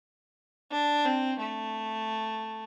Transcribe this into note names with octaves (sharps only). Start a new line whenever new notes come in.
D4
C4
A3